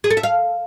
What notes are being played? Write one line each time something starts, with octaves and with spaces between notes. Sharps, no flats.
G#4
A4
E5
F5